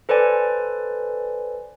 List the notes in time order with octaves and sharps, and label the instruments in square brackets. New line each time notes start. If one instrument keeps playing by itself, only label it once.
[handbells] A4 B4 C5 D5 G#5